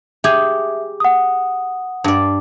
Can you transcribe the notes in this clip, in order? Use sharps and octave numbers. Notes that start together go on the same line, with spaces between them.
G4 G#4 E5 G#5
F#5 D#6
G2 D5